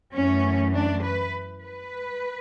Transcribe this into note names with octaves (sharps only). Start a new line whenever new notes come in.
F#2 E3 A3 C#4
D4
B4
B4